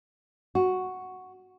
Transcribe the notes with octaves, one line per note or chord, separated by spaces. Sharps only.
F#4